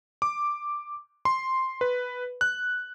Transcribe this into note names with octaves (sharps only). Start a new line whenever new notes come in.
D6
C6
B4
F#6